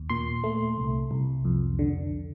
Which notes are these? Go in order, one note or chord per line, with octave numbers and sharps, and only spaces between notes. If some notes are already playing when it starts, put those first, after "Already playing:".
Already playing: D#2
A#2 C6
A3
C2
C2
F2
D3